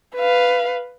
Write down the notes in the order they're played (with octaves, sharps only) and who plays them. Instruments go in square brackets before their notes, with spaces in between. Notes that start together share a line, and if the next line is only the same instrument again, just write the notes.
[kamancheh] B4 F5